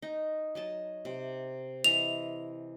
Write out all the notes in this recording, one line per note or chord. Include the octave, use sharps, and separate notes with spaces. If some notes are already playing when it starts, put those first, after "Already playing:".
D#4
F#3 D#5 A5
C3
E3 D#5 F7